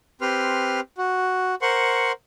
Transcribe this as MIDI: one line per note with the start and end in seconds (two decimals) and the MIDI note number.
0.21 0.80 60
0.21 0.80 67
0.21 0.80 71
0.21 0.80 84
0.21 0.80 89
0.98 1.55 66
1.62 2.12 70
1.62 2.12 72
1.62 2.12 78
1.62 2.12 84
1.62 2.12 85